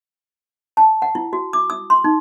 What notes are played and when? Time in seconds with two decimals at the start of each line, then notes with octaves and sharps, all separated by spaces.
0.77 A5
1.02 F#5
1.15 E4
1.33 F#4
1.53 D6
1.70 D#6
1.90 C6
2.04 D#4